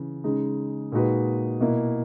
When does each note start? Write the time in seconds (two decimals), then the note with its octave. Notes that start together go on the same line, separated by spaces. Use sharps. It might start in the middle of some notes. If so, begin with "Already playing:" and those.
Already playing: C#3 E3
0.24 C#3 G#3 D#4
0.92 A#2 G#3 D#4 F#4 B4
1.61 B2 A#3 E4